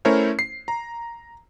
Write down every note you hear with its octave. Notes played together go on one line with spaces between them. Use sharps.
A3 C#4 E4 A#4 C5 C#5
C7
A#5